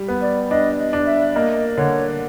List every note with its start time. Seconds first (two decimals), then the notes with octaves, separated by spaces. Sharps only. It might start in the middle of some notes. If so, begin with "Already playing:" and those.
Already playing: G3
0.08 B3
0.22 D5
0.51 D4 D#5
0.78 D#5
0.93 D4
1.07 E5
1.35 A#3 D#5
1.77 D3 C#5